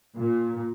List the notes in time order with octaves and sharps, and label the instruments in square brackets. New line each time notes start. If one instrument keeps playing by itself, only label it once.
[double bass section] A#2